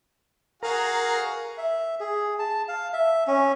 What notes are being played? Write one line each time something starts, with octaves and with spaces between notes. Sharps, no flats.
F#4 G#4 A#4 F5
E5
G#4
A5
F5
E5
C#4